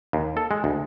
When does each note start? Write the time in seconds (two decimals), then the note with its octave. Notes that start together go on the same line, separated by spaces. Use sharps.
0.13 D#2
0.37 A4
0.51 G#3
0.64 D2